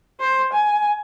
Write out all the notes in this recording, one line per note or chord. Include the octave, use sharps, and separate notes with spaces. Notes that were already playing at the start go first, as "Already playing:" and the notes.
C5
G#5